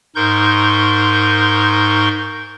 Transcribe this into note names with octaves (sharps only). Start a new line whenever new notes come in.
G#2 D#4 A#4 C6 C#6 G6